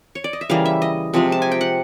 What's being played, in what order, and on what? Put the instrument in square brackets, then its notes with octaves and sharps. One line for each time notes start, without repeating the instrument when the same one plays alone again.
[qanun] C#5
D5
D#5
E5
C#3 E3 G3 A#3 F5
E5
D#5
C3 F3 G#3
A5
G#5
G5
F#5